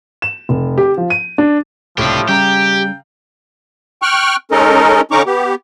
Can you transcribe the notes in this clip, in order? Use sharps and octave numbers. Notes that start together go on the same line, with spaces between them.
E7
F1
G4
F3
D#7
D4
C#2 A2 C3 F3 D4 G4
C#3 G3 G4 G5 A#5
G5 C#6 F6 F#6
G#3 C#4 D#4 A4 A#4 D#5
D3 C#4 D#4 A#5 C#6 D6
B3 G4